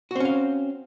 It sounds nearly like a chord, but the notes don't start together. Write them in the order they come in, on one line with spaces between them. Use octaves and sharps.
F#4 C4 C#4 F5